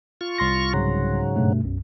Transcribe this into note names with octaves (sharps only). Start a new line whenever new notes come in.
F4 C#6
C2 C6 A#6
G#2 C#3 F#3
G2 B2 A3
B1 F#2